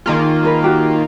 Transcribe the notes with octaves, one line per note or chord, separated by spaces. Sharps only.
D#3 A#3 F4 G#4 A#4
G#4 A#4 B4
F#4 G4 A#5